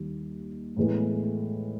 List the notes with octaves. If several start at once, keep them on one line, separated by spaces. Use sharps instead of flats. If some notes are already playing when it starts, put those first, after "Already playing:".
Already playing: D#2 D#3 G3
A2 E3 G#3 B3